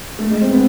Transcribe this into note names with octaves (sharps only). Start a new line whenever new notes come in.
A3
G#3
C4
B3